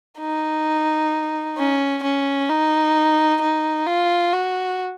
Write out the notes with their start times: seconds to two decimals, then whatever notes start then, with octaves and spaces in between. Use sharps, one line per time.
0.20 D#4
1.58 C#4
2.03 C#4
2.50 D#4
3.42 D#4
3.87 F4
4.34 F#4